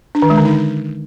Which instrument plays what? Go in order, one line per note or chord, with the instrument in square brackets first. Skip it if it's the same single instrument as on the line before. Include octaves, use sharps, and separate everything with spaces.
[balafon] D4
D#3
G#3
D3
D#4